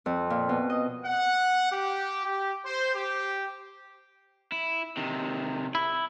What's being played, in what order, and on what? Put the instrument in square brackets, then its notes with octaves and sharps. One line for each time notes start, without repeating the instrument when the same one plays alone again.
[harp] F2
A#2
B2
D#5
[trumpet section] F#5
G4
G4
C5
G4
[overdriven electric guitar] E4
C3 D#3
[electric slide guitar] E4